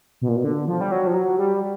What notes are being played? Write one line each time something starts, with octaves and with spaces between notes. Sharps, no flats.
B2
A#2
B2
D3
F3
G3
F#3
F3
F#3
G3